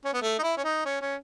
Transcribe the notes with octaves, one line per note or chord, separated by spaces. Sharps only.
C#4
B3
A3
D#4
E4
C#4
D#4
C#4
C#4